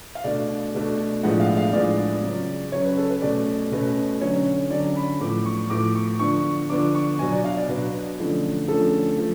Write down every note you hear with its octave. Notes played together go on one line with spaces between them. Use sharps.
F5
B2 A3 D4 D5
B2 A3 D4
A2 F3 G#3 B3 D4 F#5
F5
F5
A2 F3 G#3 B3 D4 D5
C#3 F#3 C#4
C#3 F#3 C#4 C#5
B4
A4
B4
B2 A3 C#4 D5
B2 A3 C#4 B4
D3 F#3 C#4 C#5
D3 F#3 C#4 D5
B5
A2 F3 B3 D6
C#6
A2 F3 B3 D6
C#6
D3 F3 B3 D4 C#6
D3 F3 B3 D4 D6
C#6
B2 F#3 B3 D4 G#5
D5
F5
D5
B2 F#3 B3 D4 B4
D3 F3 A3 C#4
D3 F3 A3 C#4 A4
F3 A3